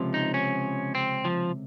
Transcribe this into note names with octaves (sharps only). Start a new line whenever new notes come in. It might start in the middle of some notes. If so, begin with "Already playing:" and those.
Already playing: C#2 C3 F3
D#4
C#4
C4
F3